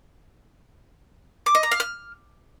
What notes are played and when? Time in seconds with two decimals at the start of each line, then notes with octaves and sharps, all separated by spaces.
1.46 D6
1.55 D#5
1.63 A#5
1.71 F5
1.80 F6